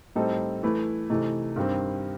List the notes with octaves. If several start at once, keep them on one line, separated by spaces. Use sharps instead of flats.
A2 G3 C4 D#4 A4
E3 A3 E4 B4
C3 E3 A3 D#4
G2 D#3 G3 C4